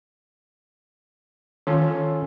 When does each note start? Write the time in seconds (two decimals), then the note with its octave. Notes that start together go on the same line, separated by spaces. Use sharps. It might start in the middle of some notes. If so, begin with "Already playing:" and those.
1.67 D#3 C#4 F4 A4